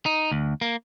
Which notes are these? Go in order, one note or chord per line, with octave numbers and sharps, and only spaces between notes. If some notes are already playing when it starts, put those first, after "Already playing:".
D#4
D2
A#3